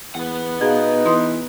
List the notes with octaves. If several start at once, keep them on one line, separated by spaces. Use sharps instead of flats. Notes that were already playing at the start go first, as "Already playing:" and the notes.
E2 B4 F#5
B2 D#4 G#4 F5
E3 B3 C6 D#6